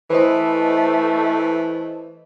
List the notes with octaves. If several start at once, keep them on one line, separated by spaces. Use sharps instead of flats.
E3 A3 B4 C5 D#5